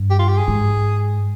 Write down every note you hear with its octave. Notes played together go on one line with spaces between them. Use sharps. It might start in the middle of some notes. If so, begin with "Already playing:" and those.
Already playing: G2
G4
F4
G4
G#4
G#2